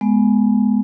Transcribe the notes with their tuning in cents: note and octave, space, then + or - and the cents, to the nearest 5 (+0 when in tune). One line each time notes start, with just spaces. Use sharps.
G#3 +15 B3 -5